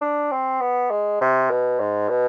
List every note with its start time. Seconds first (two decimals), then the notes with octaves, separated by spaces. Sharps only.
0.01 D4
0.31 C4
0.61 B3
0.91 G#3
1.21 C3
1.50 B2
1.80 G#2
2.09 B2